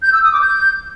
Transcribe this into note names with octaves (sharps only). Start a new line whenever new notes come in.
G6
E6
D#6
D6
G6